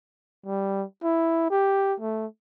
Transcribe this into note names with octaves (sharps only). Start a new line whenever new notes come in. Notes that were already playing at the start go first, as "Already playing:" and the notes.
G3
E4
G4
A3